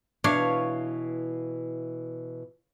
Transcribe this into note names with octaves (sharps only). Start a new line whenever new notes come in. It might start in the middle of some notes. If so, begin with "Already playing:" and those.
B2 E3 D4 C#5 F5